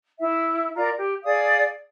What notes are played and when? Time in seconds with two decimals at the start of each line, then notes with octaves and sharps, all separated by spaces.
0.20 E4 E5
0.76 F4 A#4 D5 A#5
0.97 G4
1.24 G#4 D5 F5 D#6